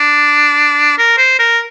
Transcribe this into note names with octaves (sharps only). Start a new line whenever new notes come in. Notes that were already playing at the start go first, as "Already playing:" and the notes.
Already playing: D4
A#4
C5
A#4